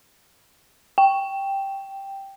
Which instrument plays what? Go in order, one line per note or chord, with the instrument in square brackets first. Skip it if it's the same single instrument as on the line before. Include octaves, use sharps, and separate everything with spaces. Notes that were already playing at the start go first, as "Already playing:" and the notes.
[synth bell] G5